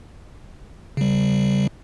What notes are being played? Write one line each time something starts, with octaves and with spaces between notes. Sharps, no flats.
C#3 G3